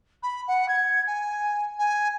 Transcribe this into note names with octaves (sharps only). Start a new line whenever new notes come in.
B5
F#5
G#6
G#5
G#5